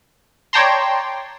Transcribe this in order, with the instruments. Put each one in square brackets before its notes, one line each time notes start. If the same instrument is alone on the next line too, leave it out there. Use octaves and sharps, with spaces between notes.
[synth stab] C#5 D5 G5 A5 A#5 C6